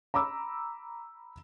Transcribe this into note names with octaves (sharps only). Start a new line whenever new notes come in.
A#5 B5 D6 E6